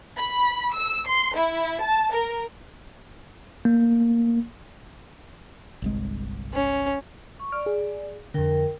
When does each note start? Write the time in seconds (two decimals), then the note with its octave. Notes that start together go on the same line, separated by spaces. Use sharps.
0.17 B5
0.72 E6
1.06 C6
1.36 E4
1.81 A5
2.11 A#4
3.65 A#3
5.82 G1 C2 G#3
6.53 C#4
7.40 C#6
7.52 D5 F6
7.66 G#4
8.34 F2 D3 A#4 G5